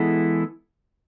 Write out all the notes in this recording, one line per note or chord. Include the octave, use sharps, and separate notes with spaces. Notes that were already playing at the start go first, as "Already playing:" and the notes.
Already playing: E3 G#3 B3 E4 A4